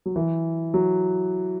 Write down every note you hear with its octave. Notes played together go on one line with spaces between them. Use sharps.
F#3
E3
F#3